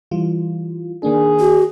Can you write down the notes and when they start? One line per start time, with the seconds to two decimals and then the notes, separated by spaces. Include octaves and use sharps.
0.11 E3 G3 F4
1.03 D#3 A#3 D4 G#4
1.40 F#4